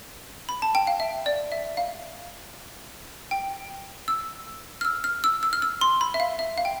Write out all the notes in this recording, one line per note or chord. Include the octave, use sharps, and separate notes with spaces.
B5
A5
G5
F5
E5
D5
E5
F5
G5
E6
F6
E6
F6
E6
E6
F6
E6
C6
B5
E5
F5
E5
F5
G5